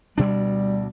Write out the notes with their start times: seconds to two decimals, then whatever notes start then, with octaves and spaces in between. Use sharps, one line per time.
0.18 D2 B2 G3 D4